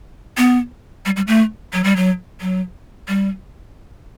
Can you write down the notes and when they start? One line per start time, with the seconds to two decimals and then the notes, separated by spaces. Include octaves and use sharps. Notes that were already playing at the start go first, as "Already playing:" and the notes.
0.38 B3
1.06 G3
1.16 G3
1.27 A3
1.73 F#3
1.84 G3
1.96 F#3
2.41 F#3
3.08 G3